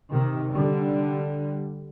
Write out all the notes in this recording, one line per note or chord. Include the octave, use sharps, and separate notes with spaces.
C3 D#3
D3 G3